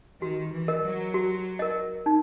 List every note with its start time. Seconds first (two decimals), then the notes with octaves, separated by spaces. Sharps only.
0.22 D#3 F#4
0.53 E3
0.68 A#4 D#5
0.84 F#3
1.14 F#4
1.59 A#4 D#5
2.06 D#4